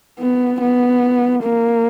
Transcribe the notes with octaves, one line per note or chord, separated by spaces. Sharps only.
B3
B3
A#3